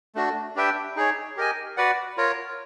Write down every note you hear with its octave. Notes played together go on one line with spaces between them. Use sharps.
A3 D4 F#4
D4 G4 B4 E5 G5
D#4 G#4 C#5
G4 A#4 D#5 G#5
F#4 B4 D5 F#5
F4 A#4 C#5